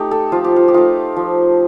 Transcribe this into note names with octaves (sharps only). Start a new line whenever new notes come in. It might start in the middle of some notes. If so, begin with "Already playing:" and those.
Already playing: A3 D#4 G4
A4
F3 F4
G4
F4
G4
A3 D#4 F4
F3